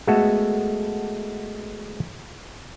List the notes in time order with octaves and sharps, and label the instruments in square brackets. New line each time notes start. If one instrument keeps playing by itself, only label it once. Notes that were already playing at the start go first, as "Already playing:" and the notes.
[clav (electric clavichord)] G#3 A3 B3 F#4 A4